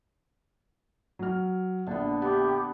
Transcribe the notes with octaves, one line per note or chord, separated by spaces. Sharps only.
F#3 F6
A#1 D3 B3
B3 G4